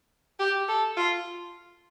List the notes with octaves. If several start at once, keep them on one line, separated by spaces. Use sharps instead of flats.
G4
A4
F4